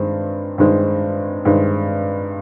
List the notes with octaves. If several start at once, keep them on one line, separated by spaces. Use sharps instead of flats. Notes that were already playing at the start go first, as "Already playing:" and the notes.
Already playing: G2 D#3 G#3 C4
G2 D#3 G#3 C4
G2 D#3 G#3 C4